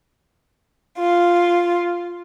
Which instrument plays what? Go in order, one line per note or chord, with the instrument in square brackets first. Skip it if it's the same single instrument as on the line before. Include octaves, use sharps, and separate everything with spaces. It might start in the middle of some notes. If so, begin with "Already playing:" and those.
[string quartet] F4